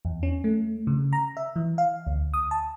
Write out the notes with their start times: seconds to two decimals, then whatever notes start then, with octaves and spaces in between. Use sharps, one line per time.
0.05 E2
0.23 C#4
0.44 A3
0.87 C#3
1.13 A#5
1.37 E5
1.56 E3
1.78 F5
2.07 D2
2.34 D#6
2.51 A5